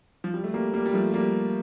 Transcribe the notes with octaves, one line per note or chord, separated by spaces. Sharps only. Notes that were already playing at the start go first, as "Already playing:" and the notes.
F3
G3
A3
G3 A#3
G3 A#3
G3
F3 A3
G3 A#3